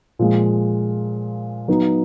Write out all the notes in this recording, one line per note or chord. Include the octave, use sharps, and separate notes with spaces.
A#2 F3 G#3
F#3 B3 D#4